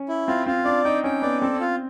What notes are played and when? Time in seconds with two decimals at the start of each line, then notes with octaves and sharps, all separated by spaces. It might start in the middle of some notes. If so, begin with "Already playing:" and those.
Already playing: C#4
0.09 E4
0.28 C4 F4
0.46 C4 F4
0.65 D4 D5
0.85 D#4 G5
1.04 C#4 G5
1.22 B3 D5
1.42 C4 A4
1.60 F4